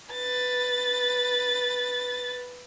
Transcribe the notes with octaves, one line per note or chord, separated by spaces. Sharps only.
B4 A6